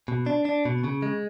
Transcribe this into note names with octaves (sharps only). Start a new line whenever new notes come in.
B2
D4
D4
B2
C#3
G#3